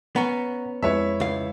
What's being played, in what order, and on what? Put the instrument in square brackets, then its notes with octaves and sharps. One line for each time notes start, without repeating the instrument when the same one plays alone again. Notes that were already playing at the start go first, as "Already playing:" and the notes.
[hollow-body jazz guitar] B3 C#4 [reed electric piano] F#5 A#5
[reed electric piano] F2 G#3 B4 [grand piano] E4 C#5 E5
[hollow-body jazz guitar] C#2 F5